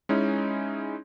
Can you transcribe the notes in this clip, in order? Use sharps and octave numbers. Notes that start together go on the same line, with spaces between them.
G#3 C#4 D#4 E4